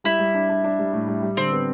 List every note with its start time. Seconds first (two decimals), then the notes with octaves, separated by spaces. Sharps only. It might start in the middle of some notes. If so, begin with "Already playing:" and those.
0.04 G3 E4
0.19 G3
0.34 D4
0.49 D4
0.64 D4
0.79 G3
0.93 A2
1.08 G3
1.23 G3
1.37 D3 C4
1.52 B3